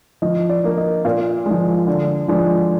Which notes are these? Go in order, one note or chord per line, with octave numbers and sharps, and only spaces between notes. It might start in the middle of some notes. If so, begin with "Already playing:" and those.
F3 D#5
D5
A#3 D4
D#5
A#2 F5
F3 G#3
D3
F3 G#3 D4